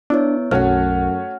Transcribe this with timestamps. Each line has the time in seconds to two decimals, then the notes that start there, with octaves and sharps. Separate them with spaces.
0.10 B3 D4 E4 C#5
0.51 B1 F#2 A3 C#4 F#4 F#5 F6